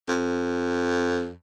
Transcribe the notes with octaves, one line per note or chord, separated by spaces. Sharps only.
F2